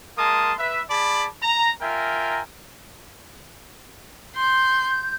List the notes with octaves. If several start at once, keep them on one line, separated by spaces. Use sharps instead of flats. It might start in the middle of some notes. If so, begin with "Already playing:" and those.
G#3 A#3 A#4 A5 C6 D#6
B4 E5
G#4 D5 A5 B5
A#5
F4 A#4 E5 G5 G#5 A#5
C6 G6